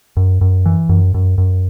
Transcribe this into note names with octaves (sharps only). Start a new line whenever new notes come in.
F#2
F#2
E3
F#2
F#2
F#2